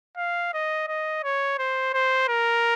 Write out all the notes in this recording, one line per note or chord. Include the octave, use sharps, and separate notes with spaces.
F5
D#5
D#5
C#5
C5
C5
A#4